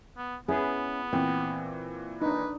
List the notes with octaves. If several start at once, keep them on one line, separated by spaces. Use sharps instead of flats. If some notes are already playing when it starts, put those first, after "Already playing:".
B3
B3 C#4 E4 G#4 B4
A#2 E3 C4
D4 D#4 B4